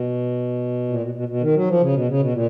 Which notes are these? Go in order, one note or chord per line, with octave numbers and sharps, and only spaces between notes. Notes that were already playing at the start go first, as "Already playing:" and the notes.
Already playing: B2
A#2
B2
B2
B2
D#3
F#3
F3
C#3
B2
C#3
B2
A#2